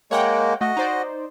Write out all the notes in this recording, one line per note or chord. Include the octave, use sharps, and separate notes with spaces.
G#3 A#3 C#5 F#5 G5
A3 F#4 D#5
D#4 C5 D5